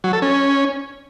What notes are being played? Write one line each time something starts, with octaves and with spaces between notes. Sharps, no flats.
F#3
A4
C#4